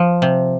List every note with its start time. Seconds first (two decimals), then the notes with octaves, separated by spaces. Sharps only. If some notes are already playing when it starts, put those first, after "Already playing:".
Already playing: F3
0.22 C3